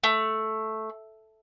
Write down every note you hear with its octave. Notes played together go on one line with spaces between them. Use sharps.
A3